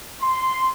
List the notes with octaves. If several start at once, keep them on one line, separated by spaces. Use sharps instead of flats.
C6